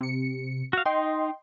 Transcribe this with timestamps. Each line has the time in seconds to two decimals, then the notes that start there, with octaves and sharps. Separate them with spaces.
0.01 C3 C#7
0.73 F#4 F5
0.86 D#4 D#5 G5 C6